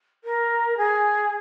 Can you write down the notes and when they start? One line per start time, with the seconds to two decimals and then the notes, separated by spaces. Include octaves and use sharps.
0.24 A#4
0.77 G#4